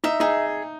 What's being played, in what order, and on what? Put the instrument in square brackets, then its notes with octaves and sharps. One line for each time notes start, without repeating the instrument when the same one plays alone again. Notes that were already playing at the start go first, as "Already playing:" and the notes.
[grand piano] D#4 [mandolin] E5
[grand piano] D#4 [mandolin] G#4